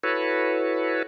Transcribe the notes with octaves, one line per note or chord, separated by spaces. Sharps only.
E4 F#4 A4 B4 C#5